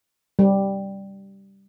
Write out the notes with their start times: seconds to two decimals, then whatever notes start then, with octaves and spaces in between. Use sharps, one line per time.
0.39 G3